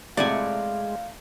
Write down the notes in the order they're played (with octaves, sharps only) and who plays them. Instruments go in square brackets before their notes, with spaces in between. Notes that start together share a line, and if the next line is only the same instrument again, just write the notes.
[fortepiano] A2 C3 [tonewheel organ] G#3 [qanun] D5 F#5 G#5 [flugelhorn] F5